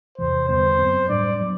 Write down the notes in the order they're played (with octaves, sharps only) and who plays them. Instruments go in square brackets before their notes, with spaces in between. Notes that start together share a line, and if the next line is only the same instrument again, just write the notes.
[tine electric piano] E2 C3 E3 [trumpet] C5
[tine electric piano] E2 D3 G3 B3 [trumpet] C5
[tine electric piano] F#2 F#3 C4
[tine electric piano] A2 G3 D4 [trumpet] D5
[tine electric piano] F#3 B3